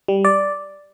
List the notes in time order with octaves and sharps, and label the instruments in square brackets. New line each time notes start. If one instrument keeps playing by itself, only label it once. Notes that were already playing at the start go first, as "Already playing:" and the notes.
[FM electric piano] G3
D5